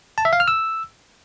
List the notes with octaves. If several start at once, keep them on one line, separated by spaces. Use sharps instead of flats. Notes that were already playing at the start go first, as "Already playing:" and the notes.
A5
E5
F5
F6
E6